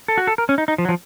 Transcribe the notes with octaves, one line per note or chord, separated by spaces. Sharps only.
A4
F#4
A4
A#4
C#4
D#4
D#4
F3
F#3
F3